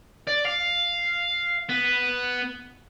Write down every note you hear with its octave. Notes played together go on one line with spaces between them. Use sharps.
D5
F5
B3